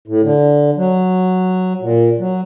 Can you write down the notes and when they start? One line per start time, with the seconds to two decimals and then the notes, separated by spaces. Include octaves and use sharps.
0.08 A2
0.23 D3
0.77 F#3
1.82 A#2
2.19 F#3